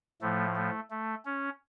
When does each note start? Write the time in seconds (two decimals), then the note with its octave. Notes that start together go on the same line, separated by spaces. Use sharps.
0.21 A2 F3 A3
0.56 A3
0.91 A3
1.25 C#4